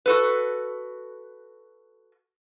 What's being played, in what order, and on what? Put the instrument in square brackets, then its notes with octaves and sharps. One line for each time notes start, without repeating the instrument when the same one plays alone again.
[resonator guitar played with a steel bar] F#4 A4 B4